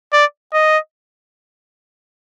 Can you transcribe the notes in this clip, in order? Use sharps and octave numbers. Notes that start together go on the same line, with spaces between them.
D5
D#5